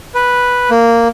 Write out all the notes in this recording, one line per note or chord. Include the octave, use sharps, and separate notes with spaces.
B4
A#3